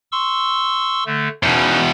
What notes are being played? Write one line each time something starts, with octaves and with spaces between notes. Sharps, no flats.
C6 C#6 E6
D3 A3
E2 B2 C#4 D#4 B4